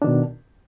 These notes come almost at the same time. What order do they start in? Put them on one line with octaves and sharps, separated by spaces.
D4 D#3 B2